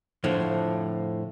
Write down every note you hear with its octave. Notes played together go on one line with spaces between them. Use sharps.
F2 A2 D3 F3